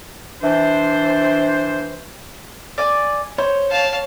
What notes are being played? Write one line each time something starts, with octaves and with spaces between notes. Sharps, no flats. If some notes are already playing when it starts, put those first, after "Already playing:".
E3 D4 C5
D5 G#5
C5 C#5
F5 A5